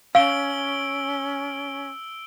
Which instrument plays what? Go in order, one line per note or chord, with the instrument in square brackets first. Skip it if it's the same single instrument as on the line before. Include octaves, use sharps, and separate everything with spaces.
[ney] C#4 [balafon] F5 [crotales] E6 D7 G7